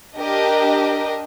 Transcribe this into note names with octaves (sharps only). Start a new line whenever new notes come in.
D4 G4 A#4 D#5